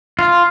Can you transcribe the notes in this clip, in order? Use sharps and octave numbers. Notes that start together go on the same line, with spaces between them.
F4